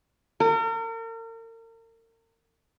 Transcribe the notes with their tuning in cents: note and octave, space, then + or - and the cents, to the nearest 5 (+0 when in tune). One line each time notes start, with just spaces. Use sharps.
A#4 -40